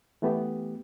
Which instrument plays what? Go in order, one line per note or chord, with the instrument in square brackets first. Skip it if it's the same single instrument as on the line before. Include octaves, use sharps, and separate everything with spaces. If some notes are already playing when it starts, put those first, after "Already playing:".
[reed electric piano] E3 A3 B3 G4